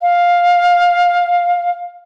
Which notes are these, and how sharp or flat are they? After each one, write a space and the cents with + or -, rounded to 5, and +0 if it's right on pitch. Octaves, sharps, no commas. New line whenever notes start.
F5 +10